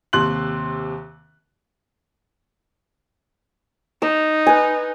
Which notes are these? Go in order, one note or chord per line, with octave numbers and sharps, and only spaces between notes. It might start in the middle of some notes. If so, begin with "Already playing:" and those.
D#2 C3 C6 F#6 F#7
D#4 E6
B4 G#5